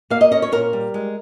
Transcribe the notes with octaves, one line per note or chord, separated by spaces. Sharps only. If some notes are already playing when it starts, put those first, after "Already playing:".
A#3 F5
D#5
C#4 D#5
C#5
A#2 A#4
G3
G#3